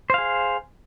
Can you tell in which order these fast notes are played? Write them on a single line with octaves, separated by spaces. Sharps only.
C5 F5 G#4